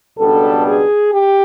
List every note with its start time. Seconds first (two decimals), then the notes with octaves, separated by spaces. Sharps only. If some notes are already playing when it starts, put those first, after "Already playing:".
0.18 C#2 B2 G3 B3 D4 A4
0.65 G#4
1.13 G4